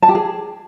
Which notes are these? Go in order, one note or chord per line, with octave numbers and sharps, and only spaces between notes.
A5
G4
G#4